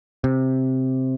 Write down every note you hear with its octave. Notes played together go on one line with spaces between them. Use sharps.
C3